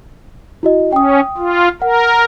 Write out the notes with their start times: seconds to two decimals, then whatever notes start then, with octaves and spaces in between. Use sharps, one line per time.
0.63 E4 F#4 D#5
0.92 C#4 G5 D#6
1.38 F4
1.82 A#4 F#5